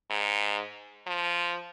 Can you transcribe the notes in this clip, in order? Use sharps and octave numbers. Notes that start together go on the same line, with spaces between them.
G#2
F3